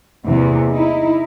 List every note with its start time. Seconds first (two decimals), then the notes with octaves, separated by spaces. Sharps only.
0.24 E2 C3 A#3
0.72 D#4 E4